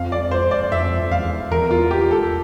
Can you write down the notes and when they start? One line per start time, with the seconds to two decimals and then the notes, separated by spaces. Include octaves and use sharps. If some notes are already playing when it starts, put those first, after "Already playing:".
Already playing: F2 F5
0.12 D5
0.31 C5
0.51 D5
0.72 F2 E5
1.11 E2 F5
1.51 E2 A#4
1.59 F2
1.67 E2 F4
1.91 G4
2.11 A4